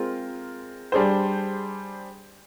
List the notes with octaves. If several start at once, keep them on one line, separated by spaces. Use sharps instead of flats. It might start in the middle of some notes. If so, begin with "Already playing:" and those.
Already playing: G#3 C4 F4 A#4
G3 D4 G#4 C5